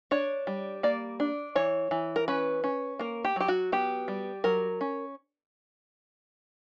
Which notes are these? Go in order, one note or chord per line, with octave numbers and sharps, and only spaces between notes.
D4 C#5
G3
A#3 D5
D4
E3 C#5
E3
A#4
C#4 B4
C#4
A#3 A#4
G4
F#3 G4
F#4
B3 G4
G3
F#3 A#4
C#4